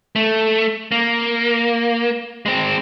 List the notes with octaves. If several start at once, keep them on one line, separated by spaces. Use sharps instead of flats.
A3
A#3
G#3 C4